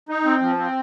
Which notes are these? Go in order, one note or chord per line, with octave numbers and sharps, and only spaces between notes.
D#4
C4
F3
C4